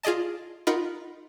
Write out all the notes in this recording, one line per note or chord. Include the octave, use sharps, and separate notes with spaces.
F4 G#4 D5 D#5 A5
D#4 F4 A#4 D#5 F#5 B5